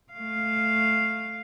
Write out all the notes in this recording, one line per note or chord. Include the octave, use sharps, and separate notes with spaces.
A3 F5